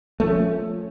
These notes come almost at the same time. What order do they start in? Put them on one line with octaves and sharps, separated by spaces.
A3 F3 C#4